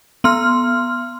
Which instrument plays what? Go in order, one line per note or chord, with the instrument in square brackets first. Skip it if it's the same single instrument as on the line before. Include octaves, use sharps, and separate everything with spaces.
[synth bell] B3 C6 F6